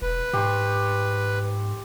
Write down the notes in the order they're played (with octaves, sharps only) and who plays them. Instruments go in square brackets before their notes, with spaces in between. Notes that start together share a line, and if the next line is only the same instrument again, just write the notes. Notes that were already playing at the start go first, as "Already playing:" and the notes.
[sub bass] E1 [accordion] B4
[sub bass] G#2 [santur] G4 C5 C#6